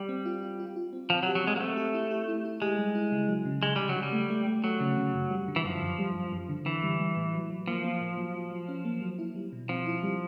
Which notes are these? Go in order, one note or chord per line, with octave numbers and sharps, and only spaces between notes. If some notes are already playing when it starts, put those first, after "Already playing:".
Already playing: G3
C4
F4
F4
F4
F4
C4
F3 C4
F#3
G4
F#3
G#3 C4
A#3
A3 C4
G4
E4
G4
E4
E4
G#3 G4
G3
E4
C#3
F#3
C#3
C#3 G#3
C#3 G3
F#3
C#3
G3
A3
A3
A3
F#3 A3
C#3
C#3
F#2
G3
D3
E3
F#2 F3
F#2
G3
F#2
F#2
D3
D3 E3
G3
G3
A2
F#3
F#3
F3 A#3
A#3
A2
F#3
F#3
F#3
C#4
A#3
F#3
E4
G3
B2
F3 C4
E4
G3